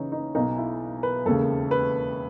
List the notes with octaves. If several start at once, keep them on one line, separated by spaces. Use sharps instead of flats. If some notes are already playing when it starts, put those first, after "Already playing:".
Already playing: C#3 E3 C#4 D#4
D#4
B1 B2 D#4
E4
B4
E1 D#2 C#3 A4
B4